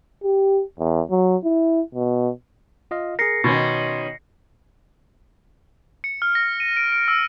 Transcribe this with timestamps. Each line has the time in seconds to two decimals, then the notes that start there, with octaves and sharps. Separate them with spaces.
0.24 G4
0.79 E2
1.10 F#3
1.44 E4
1.95 B2
2.91 F4 D#5 F5
3.19 G#4 A#4 A#6 C7 C#7
3.44 B2 D#3 C#4 C6 G#6 A6
6.04 C#7
6.22 F6
6.35 A#6
6.60 D#7
6.77 D7
6.92 D7
7.08 E6